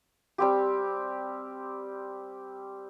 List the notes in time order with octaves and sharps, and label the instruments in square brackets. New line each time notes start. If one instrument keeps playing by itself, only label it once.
[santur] G3 C4 G4